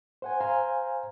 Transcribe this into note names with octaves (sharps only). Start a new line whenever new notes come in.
C5 F#5 G#5
C5 F5 G#5 A#5